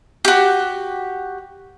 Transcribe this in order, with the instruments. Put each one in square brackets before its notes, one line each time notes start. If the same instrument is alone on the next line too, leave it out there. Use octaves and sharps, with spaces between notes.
[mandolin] F#4 G4